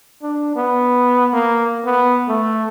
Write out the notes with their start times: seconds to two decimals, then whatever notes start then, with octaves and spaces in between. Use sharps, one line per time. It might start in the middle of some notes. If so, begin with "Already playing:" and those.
0.22 D4
0.56 B3
1.33 A#3
1.85 B3
2.28 A3